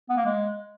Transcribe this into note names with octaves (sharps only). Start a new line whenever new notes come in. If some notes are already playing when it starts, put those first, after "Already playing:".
B3
A#3
G#3